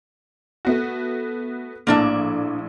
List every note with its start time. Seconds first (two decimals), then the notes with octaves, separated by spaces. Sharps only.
0.65 A3 B3 F#4
1.87 A#1 A2 A#3 D4 E5